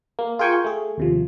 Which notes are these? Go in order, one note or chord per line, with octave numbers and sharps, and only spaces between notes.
A#3
F4 G#4 A#4 G5 G#5 C#6
A3 G#4
D#2 C3 F3